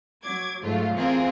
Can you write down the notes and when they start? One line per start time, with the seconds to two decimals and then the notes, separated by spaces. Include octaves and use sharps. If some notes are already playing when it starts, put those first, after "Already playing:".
0.23 F#3 D6 G#6
0.63 G#2 F#3 A3 F4
0.95 E3 C4 F4 G#4 A#4 C5